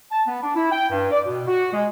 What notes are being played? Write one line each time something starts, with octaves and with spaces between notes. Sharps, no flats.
A5
B3
D4
E4
G5
G2
D5
B2
F#4
G#3